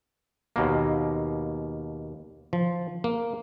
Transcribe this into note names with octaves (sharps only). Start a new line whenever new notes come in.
D#2 B2 A#3
F3
A#3